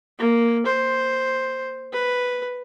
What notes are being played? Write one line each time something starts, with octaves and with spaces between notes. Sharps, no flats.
A#3
C5
B4